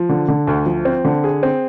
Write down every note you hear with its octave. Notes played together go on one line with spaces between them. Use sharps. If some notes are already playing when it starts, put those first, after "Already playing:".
Already playing: F3
D3
D3
D2
F3
C4
D3
G#4
C4